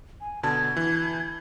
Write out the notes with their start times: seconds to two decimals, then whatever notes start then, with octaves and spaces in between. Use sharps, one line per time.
0.21 G#5
0.43 B2 D3 A5 G#6
0.77 E3